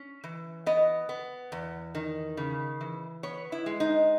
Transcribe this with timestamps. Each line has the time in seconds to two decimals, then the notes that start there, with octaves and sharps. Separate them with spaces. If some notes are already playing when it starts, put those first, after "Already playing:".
Already playing: C#4
0.24 E3
0.66 B3 D#5
1.09 B3
1.52 E2
1.95 D#3
2.37 C#3
2.81 E3
3.23 B3 C#5
3.52 E4
3.66 G#3
3.80 D#4